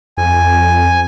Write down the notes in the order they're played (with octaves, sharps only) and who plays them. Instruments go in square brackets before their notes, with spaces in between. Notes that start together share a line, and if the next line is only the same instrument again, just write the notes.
[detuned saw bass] F2 [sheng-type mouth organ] G#5